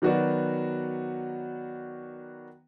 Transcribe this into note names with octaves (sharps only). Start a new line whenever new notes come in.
D#3 F#3 B3 F#4 B4 D5